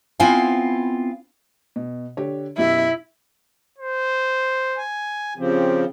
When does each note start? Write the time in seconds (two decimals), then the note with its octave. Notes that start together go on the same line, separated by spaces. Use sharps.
0.20 B3 C4 E4 F4 F5 G#5
1.76 B2
2.17 D3 G4 C#5
2.58 F#2 B2 E4 G4 E5
3.78 C5
4.78 G#5
5.38 C#3 F3 C4 G4